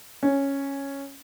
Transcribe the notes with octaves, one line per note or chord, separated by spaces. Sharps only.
C#4